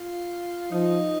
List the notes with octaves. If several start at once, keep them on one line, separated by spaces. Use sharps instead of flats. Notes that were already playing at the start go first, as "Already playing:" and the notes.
Already playing: F4
F3 D#4